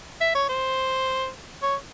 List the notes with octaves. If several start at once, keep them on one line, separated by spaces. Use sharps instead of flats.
E5
C#5
C5
C#5